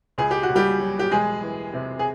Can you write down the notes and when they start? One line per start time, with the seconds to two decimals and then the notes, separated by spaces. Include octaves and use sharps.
0.18 C#2 G#4
0.31 G4
0.43 F#4
0.50 C#2
0.55 G3 G4
0.80 F#3
0.99 G4
1.11 E1 G#3 G#4
1.42 E3
1.73 C3
1.99 G#4